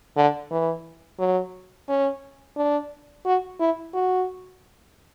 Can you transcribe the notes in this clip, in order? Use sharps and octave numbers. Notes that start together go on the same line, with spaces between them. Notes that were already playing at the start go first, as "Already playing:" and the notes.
D3
E3
F#3
C#4
D4
F#4
E4
F#4